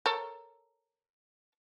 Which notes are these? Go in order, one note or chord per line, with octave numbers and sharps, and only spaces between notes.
A4 A#4 C#5